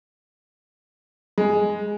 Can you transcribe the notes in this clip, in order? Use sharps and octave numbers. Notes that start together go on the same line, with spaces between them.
G#3